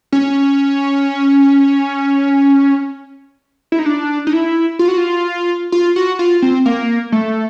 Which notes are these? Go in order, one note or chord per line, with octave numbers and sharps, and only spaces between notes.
C#4
E4
D#4
D4
D#4
E4
F4
F#4
F4
F4
F#4
F4
C4
A#3
A3